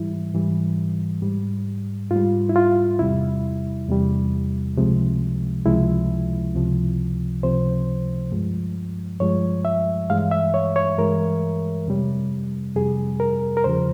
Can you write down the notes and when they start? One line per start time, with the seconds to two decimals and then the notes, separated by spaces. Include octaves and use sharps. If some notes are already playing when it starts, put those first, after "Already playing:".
Already playing: G#2 E3 G3 E4
0.33 G#2 E3 G3
1.22 G#2 G3
2.11 G#2 G3 F4
2.49 E4
2.56 F4
2.99 E2 C3 G3 E4
3.89 E2 C3 G3
4.77 C#2 C3 F3 G#3
5.66 C#2 C3 F3 G#3 E4
6.55 C#2 C3 F3
7.43 C#2 C3 F3 C5
8.32 G2 F3 G#3
9.20 G2 F3 G#3 C#5
9.65 E5
10.10 G2 E3 G#3 F5
10.31 E5
10.54 C#5
10.76 C#5
10.98 G2 E3 G#3 A#4
11.87 F2 C3 G3
12.76 F2 C3 G3 G#4
13.20 A#4
13.57 A#4
13.64 E2 C#3 F3 C5